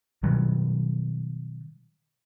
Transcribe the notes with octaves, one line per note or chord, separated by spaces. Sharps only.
B2 D#3 F#3 G3